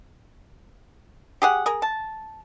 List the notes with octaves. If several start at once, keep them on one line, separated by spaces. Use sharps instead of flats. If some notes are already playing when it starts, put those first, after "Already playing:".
G4 G#4 F#5
G#4 A#4
A5